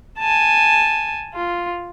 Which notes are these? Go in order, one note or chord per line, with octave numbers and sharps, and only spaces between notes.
G#5 A5
F4